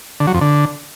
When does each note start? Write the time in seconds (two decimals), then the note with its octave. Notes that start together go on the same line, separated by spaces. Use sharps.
0.20 D3
0.27 F#3
0.34 F2
0.41 D3